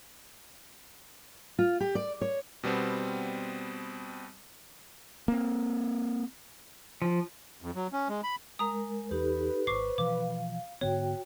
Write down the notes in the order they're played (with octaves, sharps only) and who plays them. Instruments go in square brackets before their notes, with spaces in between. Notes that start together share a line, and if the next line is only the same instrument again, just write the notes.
[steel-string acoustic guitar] F4
G4
D5
C#5
[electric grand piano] B2 G3 B3 C4
[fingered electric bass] A#3 C4
[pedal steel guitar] F3
[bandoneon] F2
F#3
C#4
G#3
B5
[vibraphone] G#3 A#4 [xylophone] A#5 D#6
[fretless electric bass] E2 [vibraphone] D#4 G4 A4 [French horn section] B4
[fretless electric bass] D#1 G#1 [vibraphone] C5 [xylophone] C#6 D6 C7
[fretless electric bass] B2 E3 F3 [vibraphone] F5 [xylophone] D6
[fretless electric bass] G#2 D3 B3 [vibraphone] F#4 G5 [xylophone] C#5